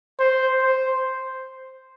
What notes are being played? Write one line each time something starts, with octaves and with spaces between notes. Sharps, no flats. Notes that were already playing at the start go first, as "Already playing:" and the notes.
C5
C5